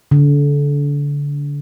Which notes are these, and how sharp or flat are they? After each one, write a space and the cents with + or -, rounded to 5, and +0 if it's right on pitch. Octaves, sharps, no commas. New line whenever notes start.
D3 -30